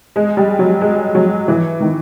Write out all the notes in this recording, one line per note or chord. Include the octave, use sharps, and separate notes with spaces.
G#3
G3
F#3
G#3
F#3
E3
D#3